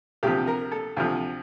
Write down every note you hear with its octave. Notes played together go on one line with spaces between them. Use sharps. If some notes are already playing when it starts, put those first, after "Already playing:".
D2 C3 F3 G4
A#4
A4
D2 C3 F3